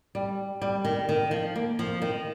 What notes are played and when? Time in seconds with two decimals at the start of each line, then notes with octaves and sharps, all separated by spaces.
0.15 G3
0.62 G3
0.85 D#3
1.09 D#3
1.31 F3
1.56 A#3
1.79 F3
2.02 D#3